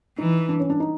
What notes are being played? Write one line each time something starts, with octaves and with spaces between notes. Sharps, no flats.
E3 D#4
D4
C#4
D4
D#4